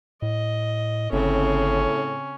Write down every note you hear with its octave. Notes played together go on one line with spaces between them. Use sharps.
A2 D#5
G1 A2 C#3 C4 C#4